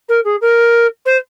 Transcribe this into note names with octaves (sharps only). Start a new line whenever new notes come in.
A#4
G#4
A#4
C5